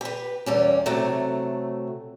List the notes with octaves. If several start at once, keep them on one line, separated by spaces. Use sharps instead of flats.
G4 B4
E2 G3 C#4
C3 F#3 A3